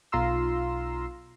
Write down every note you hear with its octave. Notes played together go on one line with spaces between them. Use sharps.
B1 F4 A#5 C6 E6